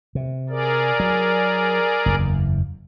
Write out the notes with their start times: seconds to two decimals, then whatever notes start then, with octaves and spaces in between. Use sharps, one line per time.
0.15 C3
0.50 G#4 A#4 D5
1.00 F#3
2.06 F#1 E2